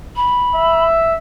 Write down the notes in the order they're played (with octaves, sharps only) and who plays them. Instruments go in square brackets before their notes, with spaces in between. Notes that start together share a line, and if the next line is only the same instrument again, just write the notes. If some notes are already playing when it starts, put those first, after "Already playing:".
[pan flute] B5
[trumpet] E5